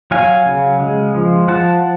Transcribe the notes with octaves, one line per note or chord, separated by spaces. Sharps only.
F#3 F5 G#5
C#3
G#3
F3
F3 F#5 A5